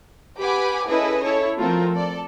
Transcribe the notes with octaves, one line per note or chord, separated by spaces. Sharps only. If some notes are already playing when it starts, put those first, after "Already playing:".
G4 B4 F#5 G#5 B5 D6
C#4 E4 G#4 A4 B4 D#5
E4 A4 C#5
F3 A3 C4 F4 A4 A#4
A4 D5